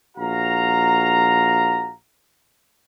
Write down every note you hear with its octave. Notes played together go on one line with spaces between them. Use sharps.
A#1 F#4 F5 A#5